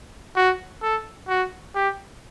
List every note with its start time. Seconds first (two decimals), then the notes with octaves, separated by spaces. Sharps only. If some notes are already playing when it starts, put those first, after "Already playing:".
0.37 F#4
0.83 A4
1.29 F#4
1.75 G4